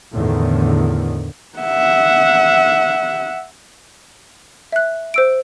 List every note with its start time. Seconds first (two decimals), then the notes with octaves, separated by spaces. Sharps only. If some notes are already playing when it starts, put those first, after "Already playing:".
0.14 E2 A2 D3 D#3
1.59 E5 F#5
4.72 E5 F#6
5.14 C5 E6 D7